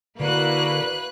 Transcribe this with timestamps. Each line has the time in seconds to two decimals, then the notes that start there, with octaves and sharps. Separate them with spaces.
0.20 D3 A#3 E4 F#4 B4 D5 F#6